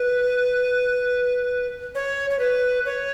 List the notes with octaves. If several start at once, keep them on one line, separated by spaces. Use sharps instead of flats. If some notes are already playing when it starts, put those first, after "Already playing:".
Already playing: B4
C#5
C#5
B4
C#5